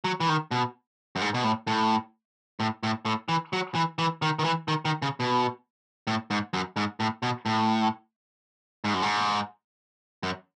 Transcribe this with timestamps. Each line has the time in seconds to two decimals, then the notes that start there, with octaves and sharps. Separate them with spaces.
0.04 F#3
0.20 E3
0.29 D#3
0.51 B2
1.16 F#2
1.21 G#2
1.34 B2
1.44 A2
1.67 A2
2.60 A2
2.83 A2
3.05 A2
3.29 E3
3.53 F#3
3.75 E3
3.98 E3
4.22 D#3
4.39 D#3
4.44 E3
4.68 D#3
4.85 D#3
5.02 C#3
5.20 B2
6.07 A2
6.31 G#2
6.53 F#2
6.76 G#2
7.00 A2
7.23 B2
7.46 A2
8.84 G#2
8.94 F#2
9.02 G#2
10.23 F#2